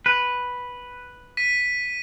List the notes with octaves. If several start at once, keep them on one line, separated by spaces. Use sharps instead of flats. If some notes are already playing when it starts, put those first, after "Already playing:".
B4
B6 D#7